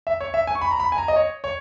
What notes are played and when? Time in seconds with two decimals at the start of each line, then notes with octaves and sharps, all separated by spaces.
0.07 E5
0.21 C#5
0.34 E5
0.47 G#5
0.55 C#6
0.61 B5
0.71 A#5
0.80 B5
0.92 G#5
0.98 A#5
1.08 D#5
1.16 C#5
1.44 C#5